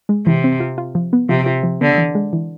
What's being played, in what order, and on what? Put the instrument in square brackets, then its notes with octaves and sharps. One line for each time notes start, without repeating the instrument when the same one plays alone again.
[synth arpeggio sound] G#3
[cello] C3 [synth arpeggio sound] E3
[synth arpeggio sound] C4
F4
F4
F3
B3
[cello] C3 [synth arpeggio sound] F3
[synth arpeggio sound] F4
F3
[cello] D3 [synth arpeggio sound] B3
[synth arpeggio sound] E3
G#3
E3